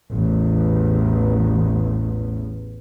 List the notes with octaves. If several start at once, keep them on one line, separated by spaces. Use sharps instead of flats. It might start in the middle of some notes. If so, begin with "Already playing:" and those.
A1 E2